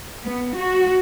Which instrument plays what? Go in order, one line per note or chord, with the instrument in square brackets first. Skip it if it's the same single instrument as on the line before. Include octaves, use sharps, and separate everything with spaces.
[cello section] B3
F#4